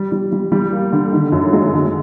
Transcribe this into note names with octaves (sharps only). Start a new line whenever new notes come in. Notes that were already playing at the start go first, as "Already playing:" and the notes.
Already playing: G3
G3
G3
G3
A#3
D3
D#3
F#2
G#3
D3